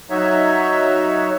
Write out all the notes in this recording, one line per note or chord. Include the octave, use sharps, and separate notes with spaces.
F#3 D#4 F#4 C#5 E5